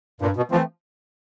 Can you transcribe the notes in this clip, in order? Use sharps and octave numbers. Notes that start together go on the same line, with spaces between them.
G2 A#2
B2
E3 F3 A3 C4